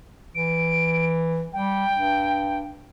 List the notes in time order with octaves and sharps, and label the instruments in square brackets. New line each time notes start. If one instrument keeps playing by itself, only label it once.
[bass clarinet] E3 [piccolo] D7
[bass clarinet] G3 [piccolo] G5
[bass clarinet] G2